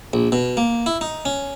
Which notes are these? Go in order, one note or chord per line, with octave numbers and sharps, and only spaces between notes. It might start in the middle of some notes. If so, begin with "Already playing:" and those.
A#1
B2
A#3
E4
D#4
C#4